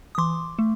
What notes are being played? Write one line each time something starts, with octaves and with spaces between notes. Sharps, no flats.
D#6
E3 C6 D6
A3